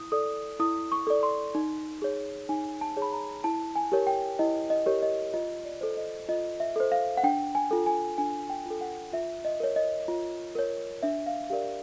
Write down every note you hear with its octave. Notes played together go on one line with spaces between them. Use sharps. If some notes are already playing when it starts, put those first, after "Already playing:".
Already playing: E4 D#6
A4 D5 D#6
E4 D#6
C#6
A4 D5
C6
D#4
G#4 C#5
D#4 G#5
A5
G#4 C#5
B5
A#5
E4 A5
G#5
G4 A#4 C#5
G5
E4 D#5
D#5
G4 A#4 C#5
D#5
F4 D#5
D5
A4 C5
D#5
F4 D#5
E5
A4 C5
F5
F#5
D4 G5
G#5
F4 A4
G#5
D4 G#5
G5
F4 A4
F#5
F4 E5
D#5
A#4 C#5
D#5
F4
A#4 C#5
D4 E5
F5
G4 A#4 D5 F5